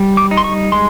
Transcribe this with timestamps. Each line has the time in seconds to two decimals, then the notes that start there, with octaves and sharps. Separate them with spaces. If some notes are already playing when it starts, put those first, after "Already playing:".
Already playing: G3
0.17 D6
0.31 D#4
0.37 C6
0.44 C#6
0.72 G#3 C6